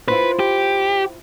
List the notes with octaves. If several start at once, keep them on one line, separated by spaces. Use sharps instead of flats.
E4 F4 B4 C5
G4